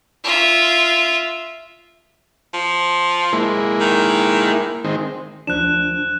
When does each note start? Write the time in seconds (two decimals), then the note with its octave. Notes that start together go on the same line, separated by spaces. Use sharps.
0.24 F4 E5
2.54 F3
3.33 G#3 A#3 E4
3.81 D#3
4.84 D#3 G#3 C4
5.47 D2 F3 D4 F#6 E7